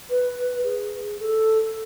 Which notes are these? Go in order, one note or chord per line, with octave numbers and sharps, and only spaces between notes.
B4
G#4
A4